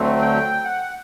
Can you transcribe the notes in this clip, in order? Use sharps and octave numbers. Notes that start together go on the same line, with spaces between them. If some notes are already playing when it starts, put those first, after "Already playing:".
Already playing: D2 D3 F#3 A3 C4
G5
F#5